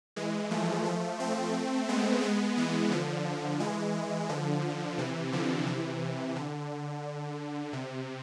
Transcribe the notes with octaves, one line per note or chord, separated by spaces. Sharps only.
E3 G#3
F3 A3
F3 A3
A3 C4
G#3 B3
G#3 B3
E3 G#3
D3 F3
E3 G#3
D3 F3
C3 E3
D3 F3
C3 E3
D3
C3